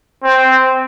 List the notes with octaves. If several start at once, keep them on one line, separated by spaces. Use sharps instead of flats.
C4